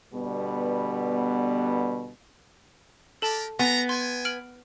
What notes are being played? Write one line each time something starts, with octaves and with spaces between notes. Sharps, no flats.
B2 D3 G3 B3
G4 A4 A#4 D5 A5
B3 D#4 G#5 A#5 A6
G5 G#5 C6
F6 D7 F#7